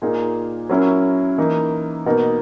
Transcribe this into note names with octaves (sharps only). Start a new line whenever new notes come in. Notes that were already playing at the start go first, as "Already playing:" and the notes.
A#2 A#3 D#4 G#4
F#3 C#4 E4 A#4
E3 A#3 D#4
B2 A#3 D#4 A#4